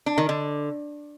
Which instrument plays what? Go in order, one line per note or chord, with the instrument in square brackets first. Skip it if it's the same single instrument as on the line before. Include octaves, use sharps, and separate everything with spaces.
[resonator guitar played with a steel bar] D4
D#3
D3